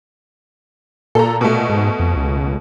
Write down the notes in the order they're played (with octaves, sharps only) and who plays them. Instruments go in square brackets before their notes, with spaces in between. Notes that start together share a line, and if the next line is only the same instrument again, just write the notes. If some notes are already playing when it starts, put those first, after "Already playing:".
[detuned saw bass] A#2 [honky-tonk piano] A4 A#5
[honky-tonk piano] B2 A3
[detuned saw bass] G#2
F2
C#2